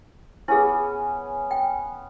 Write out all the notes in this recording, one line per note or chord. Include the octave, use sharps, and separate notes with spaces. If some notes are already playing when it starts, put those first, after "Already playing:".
B3 C#4 E4 G#4
G5